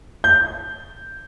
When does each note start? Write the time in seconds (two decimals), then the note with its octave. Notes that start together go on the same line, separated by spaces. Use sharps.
0.24 G6